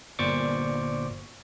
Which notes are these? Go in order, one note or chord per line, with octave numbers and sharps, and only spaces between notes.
G1 A#2 C5 D5 C#6 D6